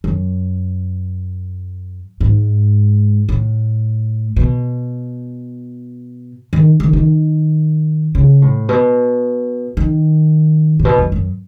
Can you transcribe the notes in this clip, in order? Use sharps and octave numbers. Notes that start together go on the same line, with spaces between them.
F#2
G#2
A2
B2
D#3
D#3
D#3
C#3
A2
B2
D#3
A2
B2
F#2
F#2